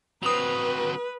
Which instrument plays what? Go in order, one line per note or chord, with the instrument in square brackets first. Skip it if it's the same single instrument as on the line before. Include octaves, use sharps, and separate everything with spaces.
[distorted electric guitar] F#3 C4 [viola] B4 [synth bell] D#6 F7